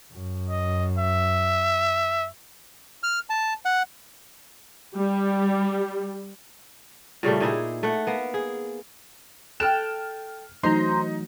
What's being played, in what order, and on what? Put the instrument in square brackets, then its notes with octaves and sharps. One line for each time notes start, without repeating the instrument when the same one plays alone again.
[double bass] F#2
[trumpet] D#5
E5
[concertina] F6
A5
F#5
[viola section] G3
[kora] A#2 C#3 G3 A3
A#2 D#4 E4 G#4
A3 F#5
A#3 B3
G#4
[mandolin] A4 G5 F#6 [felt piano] F6 E7
[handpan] E3 F#3 A3 [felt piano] D#4 [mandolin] C5 [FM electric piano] A#5 C6